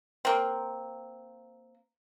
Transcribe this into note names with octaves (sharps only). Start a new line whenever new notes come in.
A#3 C4